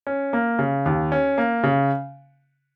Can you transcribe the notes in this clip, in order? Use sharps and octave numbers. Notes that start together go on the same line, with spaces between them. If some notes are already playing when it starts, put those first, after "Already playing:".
C#4
A#3
C#3
D#2
C#4
A#3
C#3